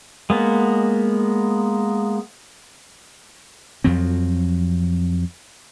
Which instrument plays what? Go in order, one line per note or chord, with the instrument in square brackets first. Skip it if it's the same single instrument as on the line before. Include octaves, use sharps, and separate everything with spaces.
[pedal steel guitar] G#3 A#3 B3
[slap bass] F2 F3 F#3 C4